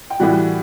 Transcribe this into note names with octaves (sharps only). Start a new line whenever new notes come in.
G5
A2 E3 G3 F#4 F#5